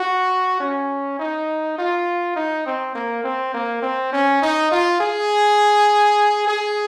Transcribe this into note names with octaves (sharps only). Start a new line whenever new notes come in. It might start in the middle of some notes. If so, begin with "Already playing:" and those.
Already playing: F#4
C#4
D#4
F4
D#4
C4
A#3
C4
A#3
C4
C#4
D#4
F4
G#4
G#4